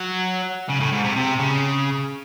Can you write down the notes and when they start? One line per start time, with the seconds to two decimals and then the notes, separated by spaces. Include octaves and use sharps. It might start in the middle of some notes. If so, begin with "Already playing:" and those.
Already playing: F#3
0.69 C#3
0.80 A2
0.92 G#2
1.04 C3
1.16 C3
1.39 C#3